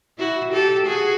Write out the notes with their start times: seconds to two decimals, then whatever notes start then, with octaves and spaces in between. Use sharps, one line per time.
0.18 E4 F#4
0.53 G4 A4
0.86 F#4 G#4